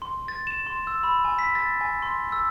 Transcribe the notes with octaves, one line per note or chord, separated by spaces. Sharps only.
C6
A6
E7
C6
E6
B5
G#5
B6
A6
G#5
C6
E6